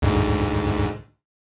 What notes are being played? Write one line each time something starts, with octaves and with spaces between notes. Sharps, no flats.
D2 G#2